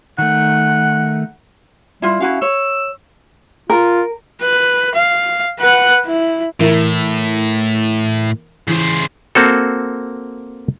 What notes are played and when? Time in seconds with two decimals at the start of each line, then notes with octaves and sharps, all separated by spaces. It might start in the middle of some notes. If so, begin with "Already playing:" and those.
0.18 D#3 A3 F#5
2.02 G3 E4 F4
2.20 C#4 E4 F#4 F5
2.42 C#5 E6
3.70 F4 A#4
4.41 B4
4.95 F5
5.60 B4 F#5
6.05 E4
6.60 A2 E3 A#4 E5
8.68 C#3 E3 C5
9.35 A#3 C4 F#4 A4